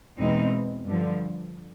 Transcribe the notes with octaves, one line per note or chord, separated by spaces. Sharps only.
E2 B2 G#3 C4 D#4
G2 D3 F3